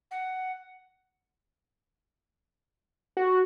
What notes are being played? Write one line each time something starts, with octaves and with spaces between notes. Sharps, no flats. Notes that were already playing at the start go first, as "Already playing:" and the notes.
F#5
F#4